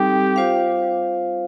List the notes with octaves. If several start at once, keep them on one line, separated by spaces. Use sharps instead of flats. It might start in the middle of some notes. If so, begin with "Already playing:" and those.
Already playing: G3 C4 D#4 G4 A4
F4 C5 F5